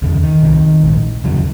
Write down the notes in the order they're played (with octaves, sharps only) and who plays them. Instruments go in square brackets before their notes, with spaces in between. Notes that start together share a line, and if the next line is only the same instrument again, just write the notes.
[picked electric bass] F1 D#2 C#3
D#3
C2 C3
A#1 G#2
F1 D#2 C#3 F#3